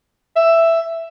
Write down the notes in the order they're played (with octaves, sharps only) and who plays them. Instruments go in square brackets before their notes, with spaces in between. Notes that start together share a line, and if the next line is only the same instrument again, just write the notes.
[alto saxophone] E5